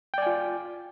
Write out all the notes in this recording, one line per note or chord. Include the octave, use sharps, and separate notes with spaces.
F4 D5 G5 G#5